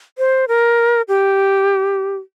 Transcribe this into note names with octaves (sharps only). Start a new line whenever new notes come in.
C5
A#4
G4